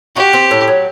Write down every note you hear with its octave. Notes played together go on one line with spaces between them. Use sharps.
F#4 G4
C4
A2
F#3